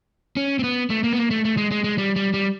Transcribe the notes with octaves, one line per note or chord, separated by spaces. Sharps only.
C#4
C4
B3
A3
A#3
B3
A#3
A3
A3
G#3
G#3
G#3
G3
G3
G3